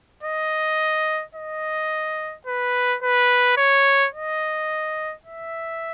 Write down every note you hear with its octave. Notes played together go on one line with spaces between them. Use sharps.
D#5
D#5
B4
B4
C#5
D#5
E5